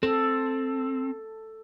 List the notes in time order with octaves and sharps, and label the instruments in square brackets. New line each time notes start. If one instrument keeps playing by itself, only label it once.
[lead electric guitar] C4 [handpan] A4